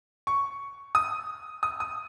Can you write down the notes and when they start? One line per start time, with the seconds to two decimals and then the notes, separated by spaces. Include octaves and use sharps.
0.27 C#6
0.95 D#6
1.63 D#6
1.80 D#6